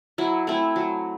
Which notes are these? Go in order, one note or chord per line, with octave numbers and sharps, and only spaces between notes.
F#3 E4
A3 C4 E4
F#3